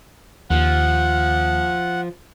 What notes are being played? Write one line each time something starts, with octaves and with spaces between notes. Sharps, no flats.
D#2 F3 F#5